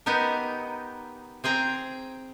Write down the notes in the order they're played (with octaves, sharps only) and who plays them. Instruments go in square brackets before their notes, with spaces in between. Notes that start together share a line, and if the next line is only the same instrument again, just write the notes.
[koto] B3 D#4 G4 A#4
C4 G#4 G5 A#5